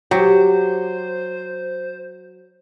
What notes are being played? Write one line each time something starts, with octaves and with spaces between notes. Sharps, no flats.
F#3 G4 C5